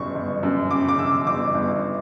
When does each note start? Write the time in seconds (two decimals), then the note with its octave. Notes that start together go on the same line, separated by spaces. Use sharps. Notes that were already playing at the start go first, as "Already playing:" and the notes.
Already playing: G1 F#2 C#3 C#6
0.15 G1
0.43 F#2
0.71 C#3 D6
0.89 D6
0.98 F#2 E6
1.26 G1 D6
1.55 G1